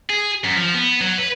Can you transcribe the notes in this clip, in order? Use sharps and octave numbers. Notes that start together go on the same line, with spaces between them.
G#4
F#2
F3
B3
F#3
B4